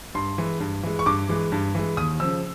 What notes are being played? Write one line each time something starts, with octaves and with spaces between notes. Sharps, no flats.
G2 C6
E3 G#3
G2
E3 G#3
C#6
G2 D6
E3 G#3
G2
E3 G#3
D#2 D#6
C#3 F3 E6